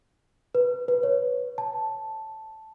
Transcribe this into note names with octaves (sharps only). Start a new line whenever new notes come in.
B4
B4
C#5
A5